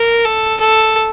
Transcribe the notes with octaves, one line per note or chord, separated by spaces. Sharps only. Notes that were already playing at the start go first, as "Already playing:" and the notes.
Already playing: A#4
A4
A4